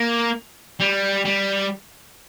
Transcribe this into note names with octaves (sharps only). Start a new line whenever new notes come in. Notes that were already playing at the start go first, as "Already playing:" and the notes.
Already playing: A#3
G3
G3